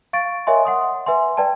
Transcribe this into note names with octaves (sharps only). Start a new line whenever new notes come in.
F5 C#6 A6 D7
A#4 C#5 D#5 E5 G#5 C6
F#5 C6 D#6
B4 E5 G#5 C6
B4 D5 G5 A5